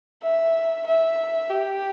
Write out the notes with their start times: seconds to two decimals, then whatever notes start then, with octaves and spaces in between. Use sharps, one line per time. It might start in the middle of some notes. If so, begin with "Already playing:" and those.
0.23 E5
0.86 E5
1.50 G4